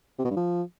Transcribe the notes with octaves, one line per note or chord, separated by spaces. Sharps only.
C3
B2
G2
F3